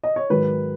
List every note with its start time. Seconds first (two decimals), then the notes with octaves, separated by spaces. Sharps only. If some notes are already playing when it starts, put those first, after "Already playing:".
0.04 D#5
0.16 C#5
0.30 G#2 D#3 F#3 B4